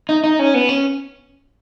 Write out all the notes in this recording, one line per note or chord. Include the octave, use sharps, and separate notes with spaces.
D#4
D#4
C#4
B3
C#4